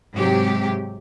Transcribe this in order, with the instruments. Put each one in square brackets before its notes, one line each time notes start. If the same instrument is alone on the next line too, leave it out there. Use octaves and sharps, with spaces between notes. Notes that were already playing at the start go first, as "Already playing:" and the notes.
[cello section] G#2 C3 F#3 G4